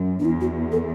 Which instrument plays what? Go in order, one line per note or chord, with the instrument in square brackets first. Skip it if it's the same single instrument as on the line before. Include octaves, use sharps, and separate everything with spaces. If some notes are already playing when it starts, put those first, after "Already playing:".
Already playing: [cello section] F#2
[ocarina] D4
[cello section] E2 [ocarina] E4
[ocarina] F#4
A4